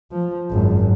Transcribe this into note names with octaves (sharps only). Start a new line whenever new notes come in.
F3
G#1 F#2